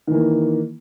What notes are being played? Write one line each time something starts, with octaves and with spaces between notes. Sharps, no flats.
D#3 E3 A#3